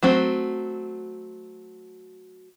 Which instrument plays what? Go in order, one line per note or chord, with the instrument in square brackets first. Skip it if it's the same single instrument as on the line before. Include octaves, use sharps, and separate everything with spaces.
[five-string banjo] F#3 A3 C4 F#4